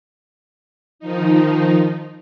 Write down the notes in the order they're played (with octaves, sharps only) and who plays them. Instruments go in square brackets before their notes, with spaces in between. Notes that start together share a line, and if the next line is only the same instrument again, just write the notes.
[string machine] D#3 F3 D#4